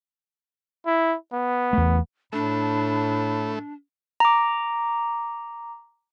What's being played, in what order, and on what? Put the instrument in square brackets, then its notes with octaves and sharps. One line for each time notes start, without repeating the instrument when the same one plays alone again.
[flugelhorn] E4
B3
[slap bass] E2 A3
[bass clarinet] A2 [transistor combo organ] A3 [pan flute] D4 [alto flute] B5
[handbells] A#5 D6